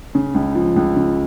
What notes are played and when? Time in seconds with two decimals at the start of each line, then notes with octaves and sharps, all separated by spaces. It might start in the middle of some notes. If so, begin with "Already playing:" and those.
0.15 C#3
0.34 C#2
0.55 F3
0.76 C#2
0.96 C#3